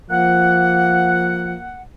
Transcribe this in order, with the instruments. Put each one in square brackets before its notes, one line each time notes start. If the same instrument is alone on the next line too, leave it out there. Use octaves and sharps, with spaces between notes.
[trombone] F3 [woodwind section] A#3 F#5